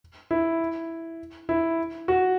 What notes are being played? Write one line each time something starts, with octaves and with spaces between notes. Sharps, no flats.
E4
E4
F#4